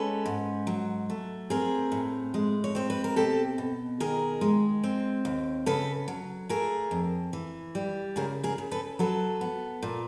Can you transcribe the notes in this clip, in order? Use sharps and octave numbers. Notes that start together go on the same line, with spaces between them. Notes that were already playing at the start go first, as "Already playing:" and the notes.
Already playing: G#3 C#4 A4 B4
G#2
F#3
A3
C4 G#4 A#4
A2
G#3
C#5
C4 C5
B4
A#4
B2 G4 A4
B2
D#3 G#4 A#4
G#3
C4
D#2
C#3 A4 B4
F#3
A3 G#4 A#4
F2
E3
G3
C#3 G#4 A#4
G#4 A#4
C#3
A4 B4
F#3 A4 B4
B3
A#2